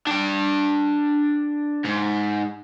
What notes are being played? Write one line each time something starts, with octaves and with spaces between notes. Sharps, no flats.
D4 G5
G#2